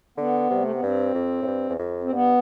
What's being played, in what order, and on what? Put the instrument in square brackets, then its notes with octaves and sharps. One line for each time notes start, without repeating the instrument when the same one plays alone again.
[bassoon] D3 [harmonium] B3
[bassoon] C3 [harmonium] G3
[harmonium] A3
B3
[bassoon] G2 [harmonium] C4
[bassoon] F2
A2
G2
E2
F2
[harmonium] C4
[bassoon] G2 [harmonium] B3